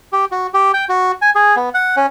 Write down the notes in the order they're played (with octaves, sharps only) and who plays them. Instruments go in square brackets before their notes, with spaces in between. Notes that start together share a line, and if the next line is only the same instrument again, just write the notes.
[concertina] G4
F#4
G4
G5
F#4
G#5
G#4
B3
F#5
C#4